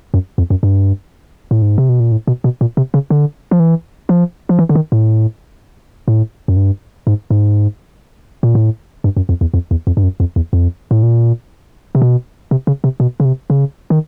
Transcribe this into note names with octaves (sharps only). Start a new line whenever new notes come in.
F#2
F2
F#2
G2
A2
G#2
C3
B2
A#2
A2
B2
B2
A#2
C3
C#3
D3
F3
E3
F3
F3
E3
D3
D#3
A2
A2
F#2
G2
G#2
G#2
A#2
A2
G2
F#2
F2
E2
F2
E2
F2
G2
F#2
F2
E2
F2
A2
A#2
C3
B2
C3
C#3
C3
B2
C#3
C3
C#3
D#3